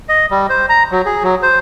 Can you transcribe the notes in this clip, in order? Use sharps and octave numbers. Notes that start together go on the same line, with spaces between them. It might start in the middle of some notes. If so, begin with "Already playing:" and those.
D#5
G3
C5
A#5
F#3
G#4
F#3
C5